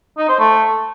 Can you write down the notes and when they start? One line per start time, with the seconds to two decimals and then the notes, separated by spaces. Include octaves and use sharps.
0.18 D#4
0.29 C5
0.39 A3